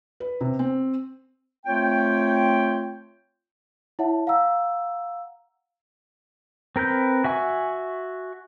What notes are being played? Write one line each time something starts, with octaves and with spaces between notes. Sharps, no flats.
B4
C3
C4
A3 C4 F4 C#5 G5
E4 C#5 E5 F#5 A5
F5 F#5 A#5 E6
C4 A#4 B4 G6
F#4 E5 G#5 C#6